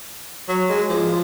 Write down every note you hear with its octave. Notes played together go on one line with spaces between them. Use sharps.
F#3
G#3
F3